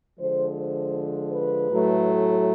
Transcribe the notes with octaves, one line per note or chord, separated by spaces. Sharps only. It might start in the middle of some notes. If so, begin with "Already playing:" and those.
D3 F3 G#3 C5
C5
B4
A2 F#3 A3